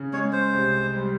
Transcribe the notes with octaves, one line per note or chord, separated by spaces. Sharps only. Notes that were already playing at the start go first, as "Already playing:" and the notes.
Already playing: C#3
G#3 C#5
C5
C2
G3